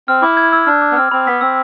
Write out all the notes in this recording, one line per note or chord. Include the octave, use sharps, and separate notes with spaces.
C4 F6
E4 D6
G#6
E6
D4 F6
D6
B3
C4 F6
C4 B5
B3 B6
C4 E6